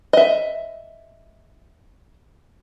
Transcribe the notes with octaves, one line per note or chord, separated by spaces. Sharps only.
D#5 E5